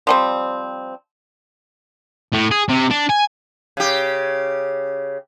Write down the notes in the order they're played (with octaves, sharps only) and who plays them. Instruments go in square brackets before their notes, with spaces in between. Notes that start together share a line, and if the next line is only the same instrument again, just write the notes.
[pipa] F3 G3 C4
[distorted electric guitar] A2
G#4
C3
D4
G#5
[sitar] C#3 G4